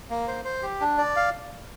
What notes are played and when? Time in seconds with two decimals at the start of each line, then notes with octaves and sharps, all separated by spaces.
0.10 A#3
0.28 C5
0.45 C5
0.62 G4
0.81 D4
0.98 D5
1.16 F5